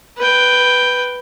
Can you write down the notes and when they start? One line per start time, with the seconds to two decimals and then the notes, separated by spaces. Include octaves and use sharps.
0.18 B4 G5